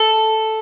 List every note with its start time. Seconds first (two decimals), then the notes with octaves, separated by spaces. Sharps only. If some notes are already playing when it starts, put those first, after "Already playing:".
Already playing: A4